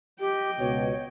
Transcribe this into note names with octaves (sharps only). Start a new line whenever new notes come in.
G4 D#5 G5
C#2 B2 C#5